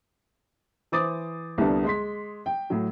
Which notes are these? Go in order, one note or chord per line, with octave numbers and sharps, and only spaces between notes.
E3 C5 D6 D#6 A6
C2 D3 G3 B3 D4 A5
G#3 C6 B6
G5
A2 F#3